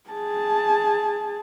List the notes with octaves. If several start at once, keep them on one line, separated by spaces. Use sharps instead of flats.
G#4 A5